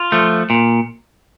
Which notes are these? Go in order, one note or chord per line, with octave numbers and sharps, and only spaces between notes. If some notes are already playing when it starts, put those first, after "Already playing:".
Already playing: F4
F3 A3
A#2